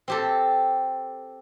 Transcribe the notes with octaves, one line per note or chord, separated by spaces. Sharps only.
C4 G4 A4